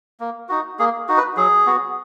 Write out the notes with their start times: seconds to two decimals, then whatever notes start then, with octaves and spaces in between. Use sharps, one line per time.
0.20 A#3
0.49 D#4 F#4
0.79 A#3 G#4
1.08 D#4 F#4
1.17 B4
1.37 F#3 G#4
1.66 B3 F#4